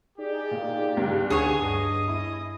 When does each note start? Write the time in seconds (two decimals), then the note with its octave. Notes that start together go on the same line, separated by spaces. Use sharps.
0.18 D#4 G4 G#4 D5
0.51 A#2
0.97 C#2 G2
1.30 D2 D4 G#4 B4 C#5 F#5
1.60 G2 D#5 D#6
2.08 E4